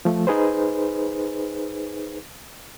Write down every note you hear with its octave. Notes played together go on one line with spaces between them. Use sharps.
F3 A3
D#4 G#4 B4 C5